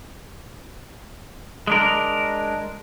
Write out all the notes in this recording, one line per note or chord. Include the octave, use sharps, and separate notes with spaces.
G#3 D4 A#4